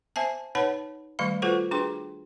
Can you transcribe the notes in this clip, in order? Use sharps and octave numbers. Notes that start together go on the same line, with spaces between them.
C5 E5 G#5 A5
D#4 B4 C#5 F#5 A5 B5
D#3 G3 A3 F5 B5
F4 F#4 A4 B4 C5 F#5
D4 F#4 G#4 B4 G5 C6